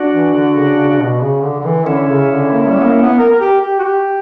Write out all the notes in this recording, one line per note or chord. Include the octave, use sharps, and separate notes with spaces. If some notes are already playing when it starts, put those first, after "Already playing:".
Already playing: D4 F#4
E3
D3
C#3
C#3
C#3
B2
C#3
D3
D3
E3
D3 C#4 E4
C#3
D3
A#3
G3
B3
A#3
B3
A#4
A#4
G4
G4
F#4
G4